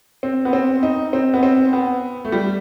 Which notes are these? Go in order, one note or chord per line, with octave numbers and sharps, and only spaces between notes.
C4
B3
C4
D#4
C4
B3
C4
B3
A3
G3